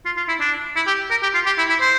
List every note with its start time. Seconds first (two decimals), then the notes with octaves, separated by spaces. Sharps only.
0.05 F4
0.17 F4
0.29 E4
0.41 D4
0.76 E4
0.87 G4
1.11 A#4
1.23 G4
1.34 F4
1.46 G4
1.58 E4
1.69 E4
1.81 C5